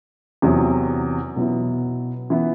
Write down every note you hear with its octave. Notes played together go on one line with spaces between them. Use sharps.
E2 C3 F#3
B2 F#3 B3 E4
E3 B3